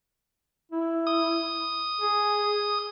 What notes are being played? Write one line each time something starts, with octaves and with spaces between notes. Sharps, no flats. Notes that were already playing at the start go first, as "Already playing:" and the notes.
E4
D#6
G#4